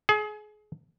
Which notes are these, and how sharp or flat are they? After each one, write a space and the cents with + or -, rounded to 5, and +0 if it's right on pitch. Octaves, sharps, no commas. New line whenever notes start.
G#4 +30